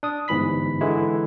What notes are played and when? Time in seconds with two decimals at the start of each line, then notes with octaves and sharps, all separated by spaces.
0.03 D4 D#6
0.28 G1 G#2 E3 B5 B6
0.81 D3 E3 G#3 E4